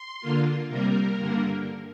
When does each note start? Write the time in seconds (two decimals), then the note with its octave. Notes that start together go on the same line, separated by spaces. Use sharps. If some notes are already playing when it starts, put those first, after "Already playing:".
Already playing: C6
0.21 D3 A#3 F4
0.68 C3 G3 A#3 A#4
1.17 G2 D3 A#3